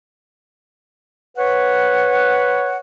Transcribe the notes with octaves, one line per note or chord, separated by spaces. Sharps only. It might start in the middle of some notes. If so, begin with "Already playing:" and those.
B4 C#5 F#5